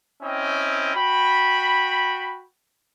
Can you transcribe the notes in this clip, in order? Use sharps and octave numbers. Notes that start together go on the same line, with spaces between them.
C4 C#4 E4 D#5 G5
F#4 G5 B5